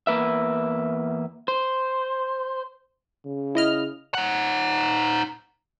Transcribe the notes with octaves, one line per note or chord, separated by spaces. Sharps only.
E2 A#3 B4 E5
C5
C#3
E4 D#5 F6
D#4 F#5